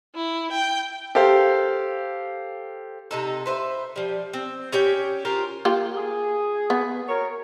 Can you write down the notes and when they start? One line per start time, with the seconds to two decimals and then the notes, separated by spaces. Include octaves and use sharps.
0.15 E4
0.52 G5
1.15 G4 A4 C5 F5
3.11 C3 D#4 A4
3.46 B4 C5 E5
3.96 F3 G3
4.33 C4
4.72 C#4 G4 C#5 G5
5.25 F4 G4 A#4 C5
5.65 A#3 F4 G4
5.97 G#4
6.70 B3
7.08 F#4 A#4 C#5